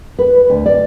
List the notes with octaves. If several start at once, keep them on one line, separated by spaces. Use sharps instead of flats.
B4
D2
D5